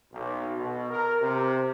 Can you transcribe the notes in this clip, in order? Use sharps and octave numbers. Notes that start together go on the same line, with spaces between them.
B1
B2
A#4
C3